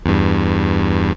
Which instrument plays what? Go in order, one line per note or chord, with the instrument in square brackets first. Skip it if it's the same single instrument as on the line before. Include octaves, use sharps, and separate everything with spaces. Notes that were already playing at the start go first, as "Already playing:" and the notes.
[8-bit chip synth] E2 G2